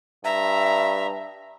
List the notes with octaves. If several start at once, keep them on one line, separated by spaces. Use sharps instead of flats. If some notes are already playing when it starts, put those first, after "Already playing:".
G2 E5 A#5